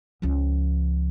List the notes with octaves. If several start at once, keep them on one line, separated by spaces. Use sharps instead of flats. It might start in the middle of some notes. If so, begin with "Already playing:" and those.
C#2 F3